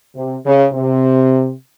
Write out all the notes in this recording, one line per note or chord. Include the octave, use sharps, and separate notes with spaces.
C3
C#3
C3